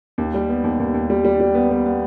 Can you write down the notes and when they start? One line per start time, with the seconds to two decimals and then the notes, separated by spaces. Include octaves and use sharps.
0.18 D#2
0.34 G3
0.49 B3
0.64 D#2
0.80 D#2
0.94 D#2
1.10 G3
1.25 G3
1.40 G3
1.55 B3
1.71 G3
1.86 B3